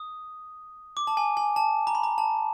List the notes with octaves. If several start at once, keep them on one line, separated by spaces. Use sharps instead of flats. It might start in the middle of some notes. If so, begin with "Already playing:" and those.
Already playing: D#6
D6
A5
G#5
G#5
A5
A#5
B5
A#5
A5